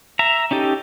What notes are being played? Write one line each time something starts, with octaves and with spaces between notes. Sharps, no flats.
E5 A#5
C#4 D#4 G4 A4